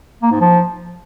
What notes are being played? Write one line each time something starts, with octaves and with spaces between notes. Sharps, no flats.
A#3
G#2
F3